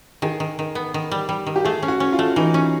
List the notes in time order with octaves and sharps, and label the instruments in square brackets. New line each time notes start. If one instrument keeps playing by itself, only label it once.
[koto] D#3 [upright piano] G#4
[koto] D#3
D#3
B3
D#3
G3
G3
D#3
[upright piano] G4
[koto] A3 [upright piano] G#4
[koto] C#4
[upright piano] F#4
[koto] C#4
[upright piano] F4
[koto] A3
[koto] E3 [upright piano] D#4
[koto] C#4